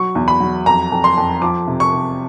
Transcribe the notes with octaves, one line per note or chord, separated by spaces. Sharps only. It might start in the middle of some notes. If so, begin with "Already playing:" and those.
Already playing: F#3 C#6
E2
B5
F#3
F2 A#5
F2
C6
F2
F3 D6
C3
C#6
C3